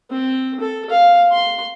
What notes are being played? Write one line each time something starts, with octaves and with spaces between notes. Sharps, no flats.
C4
A4
F5
C6